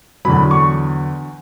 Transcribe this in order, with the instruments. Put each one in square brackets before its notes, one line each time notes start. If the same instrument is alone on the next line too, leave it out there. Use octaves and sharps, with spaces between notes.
[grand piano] F#3 B5
E2 D3
C#6